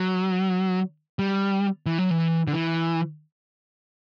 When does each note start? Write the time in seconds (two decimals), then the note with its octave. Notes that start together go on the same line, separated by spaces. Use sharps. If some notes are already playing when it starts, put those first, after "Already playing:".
Already playing: F#3
1.19 G3
1.86 E3
1.98 F#3
2.11 E3
2.48 D3
2.53 E3